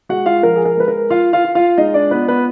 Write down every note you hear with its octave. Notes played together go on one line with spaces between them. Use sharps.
G#3 F#4 F#5
F4 F5
F3 A#4
G#4
A#4
G#3 B4
A#4
F4 F5
F4 F5
F4
F4 F5
G#3 D#4 D#5
D4 D5
B3 F4 B4
B3 B4